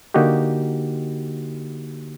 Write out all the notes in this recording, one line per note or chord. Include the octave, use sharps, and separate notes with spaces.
D3 A#3 D#4 F#4 G4